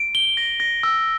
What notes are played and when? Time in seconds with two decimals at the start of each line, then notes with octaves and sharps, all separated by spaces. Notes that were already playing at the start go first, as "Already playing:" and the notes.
Already playing: D7
0.15 G7
0.37 A#6
0.60 A#6
0.83 E6